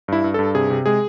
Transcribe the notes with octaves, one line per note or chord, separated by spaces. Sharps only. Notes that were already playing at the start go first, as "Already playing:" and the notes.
G2 E4
G2
G2 A4
C3 G#4
C3
G#3 G#4